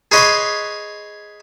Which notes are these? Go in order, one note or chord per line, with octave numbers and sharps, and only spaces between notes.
G#4 B4 C#5 D#5 B5 C6